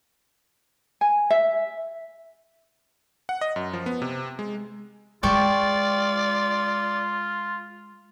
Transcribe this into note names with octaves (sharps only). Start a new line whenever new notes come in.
G#5
E5
F#5
D#5
F#2
F3
B3
C3
G#3
G#3 F4 D5 G5 A5 C#6